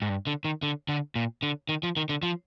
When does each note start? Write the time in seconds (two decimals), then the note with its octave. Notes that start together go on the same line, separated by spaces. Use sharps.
0.02 G#2
0.09 G2
0.27 D3
0.45 D#3
0.63 D3
0.89 D3
1.15 A#2
1.43 D3
1.69 D#3
1.83 F3
1.97 D#3
2.09 D3
2.23 F3